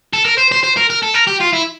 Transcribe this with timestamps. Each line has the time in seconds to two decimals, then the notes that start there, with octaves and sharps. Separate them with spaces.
0.13 A4
0.25 A#4
0.38 C5
0.52 C5
0.63 C5
0.77 A#4
0.90 A#4
1.03 A4
1.15 A#4
1.27 G4
1.41 F4
1.53 E4